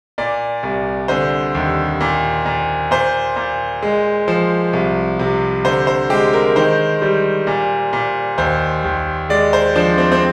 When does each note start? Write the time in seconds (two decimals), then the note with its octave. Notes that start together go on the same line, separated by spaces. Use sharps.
0.18 A#2 D5
0.63 C2
1.08 D3 C5
1.55 D#2
2.01 A#2
2.46 A#2
2.91 A#2 C5
3.36 A#2
3.82 G#3
4.28 F3
4.73 C2
5.19 C3
5.65 D3 C5
5.87 C5
6.10 G#3 G4
6.33 A#4
6.56 D#3 C5
7.02 G3
7.47 A#2
7.93 A#2
8.38 D#2 C5
8.84 D#2
9.29 G#3 D5
9.53 C5
9.76 F3 D4
9.98 C4
10.12 C4